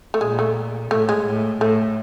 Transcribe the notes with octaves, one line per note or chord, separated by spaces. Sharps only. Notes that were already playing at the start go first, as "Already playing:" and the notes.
A3
A#2 G#3
A3
A2 A3
G#3
A2
A2 A3